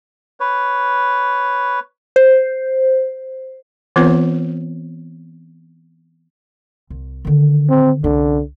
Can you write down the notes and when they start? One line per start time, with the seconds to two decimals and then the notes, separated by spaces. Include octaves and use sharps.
0.40 B4 C#5
2.16 C5
3.96 E3 B3 C4 F4 B4 C#5
6.90 C2
7.25 D3 D#3
7.69 C4
8.04 C2 D3 C#4